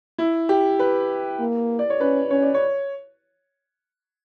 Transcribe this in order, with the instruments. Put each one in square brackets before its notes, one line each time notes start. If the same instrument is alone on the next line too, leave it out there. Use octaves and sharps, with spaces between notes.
[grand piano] E4
G4
B4
[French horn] A#3
[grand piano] D5
C#5
[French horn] C#4 [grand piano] B4
[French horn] C#4 [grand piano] C#5
[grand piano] D5
C#5